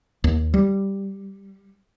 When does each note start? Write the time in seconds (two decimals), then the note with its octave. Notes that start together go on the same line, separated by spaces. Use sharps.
0.24 D#2
0.54 G3